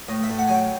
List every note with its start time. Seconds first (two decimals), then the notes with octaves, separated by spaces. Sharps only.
0.08 A2 D#5
0.23 E5
0.29 A2
0.38 F#5
0.48 F#3 G#5
0.54 G5